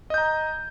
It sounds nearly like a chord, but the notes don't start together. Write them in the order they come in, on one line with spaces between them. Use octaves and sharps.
D#5 G6 A#5